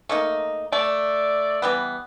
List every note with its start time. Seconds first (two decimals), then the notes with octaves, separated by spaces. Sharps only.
0.09 A3 A#3 D#4
0.73 A3 D5
1.62 E3 G3 B3